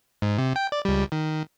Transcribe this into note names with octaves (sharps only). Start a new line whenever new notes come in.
G#2
C3
G5
D5
C#2 G3
D#3